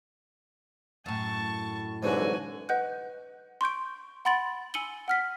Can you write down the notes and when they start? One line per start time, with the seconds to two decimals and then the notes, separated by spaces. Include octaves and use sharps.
1.06 F#2 A2 A5 C#6
2.03 C2 G#2 D3 E3 F#3 F#4 G#5
2.69 B4 D#5 F#5 F#6 G6
3.61 C6 C#6 G6 D7
4.25 F#5 B5 C6 A6 D7 F#7
4.74 G#5 E6 C#7 D#7 F#7 G7
5.08 F#5 F6 B6